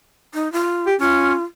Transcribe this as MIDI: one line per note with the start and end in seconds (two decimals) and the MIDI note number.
0.34 0.51 63
0.53 0.87 65
0.87 0.95 67
1.00 1.33 61
1.00 1.43 65